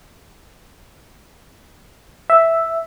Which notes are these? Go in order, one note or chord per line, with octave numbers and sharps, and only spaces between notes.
E5